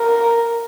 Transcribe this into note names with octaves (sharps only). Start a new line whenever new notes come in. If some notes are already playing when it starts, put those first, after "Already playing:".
Already playing: A#4